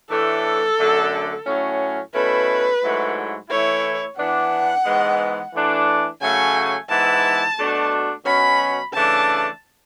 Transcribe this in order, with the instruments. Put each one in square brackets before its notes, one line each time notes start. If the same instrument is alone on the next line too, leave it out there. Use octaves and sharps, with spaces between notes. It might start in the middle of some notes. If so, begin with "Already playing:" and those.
[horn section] A2 E3 A3 D4 [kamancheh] A4
[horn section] F#2 D3 A3 D4
A2 F#3 C#4
[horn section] B2 A3 C#4 E4 [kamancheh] B4
[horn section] G#2 F#3 A3 E4
[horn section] E3 A3 E4 [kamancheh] C#5
[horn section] E3 B3 D4 [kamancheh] F#5
[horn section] G#2 E3 G#3 B3
E3 A3 D4
[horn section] C#3 F#3 A3 [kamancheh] G#5
[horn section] G#2 E3 B3 E4 [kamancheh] A5
[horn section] B2 A3 D4 F#4
[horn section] B2 F#3 C#4 [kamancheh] B5
[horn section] C#3 E3 A3 D4 [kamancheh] A5